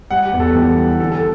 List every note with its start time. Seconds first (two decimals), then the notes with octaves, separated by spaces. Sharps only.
0.11 G3 F#5
0.25 G4
0.33 E2
0.40 A4
0.55 E3 G4
0.78 G3
1.00 D3 A4
1.12 A4